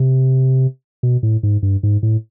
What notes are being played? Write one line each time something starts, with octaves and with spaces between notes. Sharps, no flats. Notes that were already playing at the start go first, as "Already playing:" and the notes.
Already playing: C3
B2
A2
G#2
G2
G#2
A2